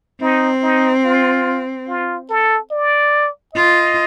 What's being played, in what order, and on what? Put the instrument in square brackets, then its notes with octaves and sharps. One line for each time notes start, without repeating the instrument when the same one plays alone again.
[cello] C4 [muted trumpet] D#4
[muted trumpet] D#4
F4
F4
A4
D5
[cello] F4 [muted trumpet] D#5